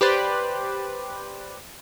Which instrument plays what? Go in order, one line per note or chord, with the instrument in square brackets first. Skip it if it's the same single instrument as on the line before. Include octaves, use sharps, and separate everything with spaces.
[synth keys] G4 B4 C5 D5